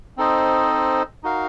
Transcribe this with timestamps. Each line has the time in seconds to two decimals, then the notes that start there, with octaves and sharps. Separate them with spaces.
0.17 C4 D#4 A4 C5 D#5
1.23 D#4 F#4 A#4 F5